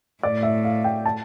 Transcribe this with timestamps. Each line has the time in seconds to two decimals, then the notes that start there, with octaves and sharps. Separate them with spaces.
0.23 A2 D5
0.43 E5
0.64 F5
0.84 G5
1.06 A5